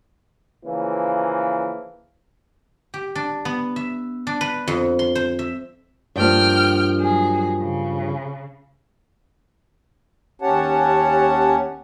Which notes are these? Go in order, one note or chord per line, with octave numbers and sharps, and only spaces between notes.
C#3 E3 F3 A#3
G4
D4
B3
E5
D4
B4
F2
C6
C5
E5
G2 F3 A#3 G5 F6
F#3 G#4
C#3
D#2 C#4 G4 C#5 F#5 A5